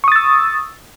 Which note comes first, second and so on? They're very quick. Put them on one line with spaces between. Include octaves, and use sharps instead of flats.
C#6 D#6 A6 E6